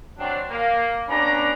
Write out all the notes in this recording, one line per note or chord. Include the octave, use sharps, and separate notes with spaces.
F#3 C4 D4
A#3
B3 C#4 D4 G4 A#5